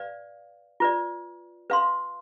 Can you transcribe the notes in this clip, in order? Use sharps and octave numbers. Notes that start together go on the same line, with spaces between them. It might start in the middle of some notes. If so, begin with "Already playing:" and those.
Already playing: B4 D5 F5
F4 B4 D5
B4 F5 C6